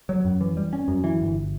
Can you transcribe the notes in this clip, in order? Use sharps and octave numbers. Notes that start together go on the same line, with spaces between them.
F#3
F#2
E3
G3
C#4
F#2
E3
G1